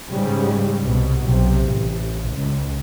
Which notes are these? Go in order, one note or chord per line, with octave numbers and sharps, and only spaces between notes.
G#2 C#3 G3
C2 B2
B1 C3
A1
C#2